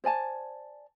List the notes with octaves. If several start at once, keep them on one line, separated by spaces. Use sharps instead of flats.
C5 D5 G#5 A5